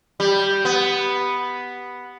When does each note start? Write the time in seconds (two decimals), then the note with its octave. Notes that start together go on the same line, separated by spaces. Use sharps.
0.20 G3
0.65 B3